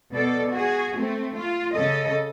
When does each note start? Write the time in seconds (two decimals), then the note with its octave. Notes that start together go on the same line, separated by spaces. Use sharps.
0.12 B2 A4 D5
0.51 F#4 G#4
0.95 A3 C4
1.35 F4
1.73 C#3 A4 D#5